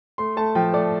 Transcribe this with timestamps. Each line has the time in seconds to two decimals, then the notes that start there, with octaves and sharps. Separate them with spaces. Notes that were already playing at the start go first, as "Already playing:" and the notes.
0.18 A3 C6
0.37 A3 A5
0.55 F3 G5
0.73 A3 D5